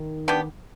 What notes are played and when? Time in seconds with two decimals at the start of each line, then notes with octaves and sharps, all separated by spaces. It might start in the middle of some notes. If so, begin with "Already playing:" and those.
Already playing: D#3
0.28 B3 D4 G4